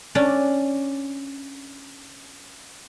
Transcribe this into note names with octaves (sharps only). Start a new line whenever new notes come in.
C#4 D4 D5